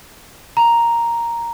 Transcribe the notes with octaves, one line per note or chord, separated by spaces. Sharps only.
A#5